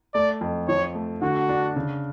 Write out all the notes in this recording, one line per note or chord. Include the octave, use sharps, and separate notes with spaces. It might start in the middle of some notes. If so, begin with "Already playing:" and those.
A3 D5
F2
F3 C#5
A3
D3 F#4
D4
C#3